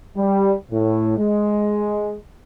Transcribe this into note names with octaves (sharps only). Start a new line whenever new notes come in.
G3
A2
G#3